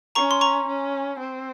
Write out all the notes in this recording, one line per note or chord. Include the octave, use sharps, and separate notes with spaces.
C#4 A#5 C#6
C6
A#5 C#6
C#4
C4